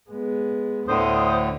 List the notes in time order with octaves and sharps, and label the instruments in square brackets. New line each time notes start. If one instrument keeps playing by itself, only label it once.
[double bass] G#3 B3
[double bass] D2 [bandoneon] A2 D3 [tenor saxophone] C5 [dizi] D#6